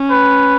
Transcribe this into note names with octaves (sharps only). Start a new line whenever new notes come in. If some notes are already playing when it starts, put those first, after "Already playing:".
Already playing: C#4
B4